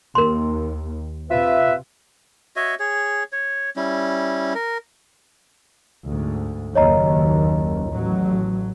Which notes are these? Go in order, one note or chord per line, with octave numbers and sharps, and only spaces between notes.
D#2 A#4 C6
C3 F4 B4 E5
F#4 C#5 D#5 E5
G#4 C#5
C#5
G3 C#4 E4
A#4
D2 G#2
F#1 D#2 C#5 D#5 A#5
A1 F#3